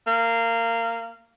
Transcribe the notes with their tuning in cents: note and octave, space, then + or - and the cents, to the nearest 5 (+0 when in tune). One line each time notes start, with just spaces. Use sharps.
A#3 -20